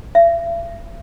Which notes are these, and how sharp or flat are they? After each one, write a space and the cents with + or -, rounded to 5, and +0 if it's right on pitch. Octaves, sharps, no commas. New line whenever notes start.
E5 +45